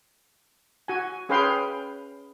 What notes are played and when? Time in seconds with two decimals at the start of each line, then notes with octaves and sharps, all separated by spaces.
0.88 F#4 G#5
1.29 C#4 G#4 B4 F5 G5 C6